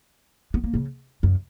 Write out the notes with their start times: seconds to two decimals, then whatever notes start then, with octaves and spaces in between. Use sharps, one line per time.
0.54 B3
0.64 A#3
0.74 C#3
1.23 F#2